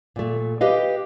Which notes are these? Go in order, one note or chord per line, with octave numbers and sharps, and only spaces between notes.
A#2 A3
G4 B4 D#5 F5